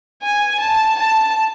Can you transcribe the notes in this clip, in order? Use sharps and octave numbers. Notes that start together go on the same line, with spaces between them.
G#5
A5
A5